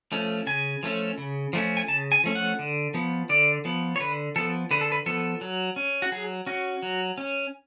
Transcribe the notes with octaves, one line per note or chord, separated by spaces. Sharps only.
F3 A3 C#4
C#3 G#5
F3 A3 C#4
C#3
F3 A3 C#4
G#5
C#3 A5
G#5
F3 A3 C#4
F#5
D3
F3 B3
D3 D5
F3 B3
C#5
D3 B4
F3 B3 A4
D3 B4
A4
B4
F3 B3 A4
F#3
C#4
F#4
F#3 G#4
C#4 F#4
F#3
C#4